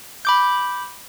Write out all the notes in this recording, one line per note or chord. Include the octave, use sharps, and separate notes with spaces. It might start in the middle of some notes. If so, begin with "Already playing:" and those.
B5 D6 G6